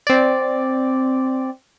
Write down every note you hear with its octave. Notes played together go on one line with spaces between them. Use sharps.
C4 D5